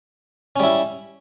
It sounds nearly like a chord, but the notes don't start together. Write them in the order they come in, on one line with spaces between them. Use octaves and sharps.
C#4 G3 E4